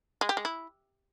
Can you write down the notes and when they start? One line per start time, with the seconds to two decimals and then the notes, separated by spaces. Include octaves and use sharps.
0.21 G#3
0.29 G4
0.37 G#3
0.45 E4